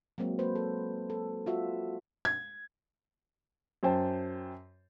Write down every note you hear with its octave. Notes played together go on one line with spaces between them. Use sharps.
F#3 G#3 A#3 C4
A#3 B4 C5
A4
A4
F4 F#4 E5
G#6
F#2 C5 G5 A5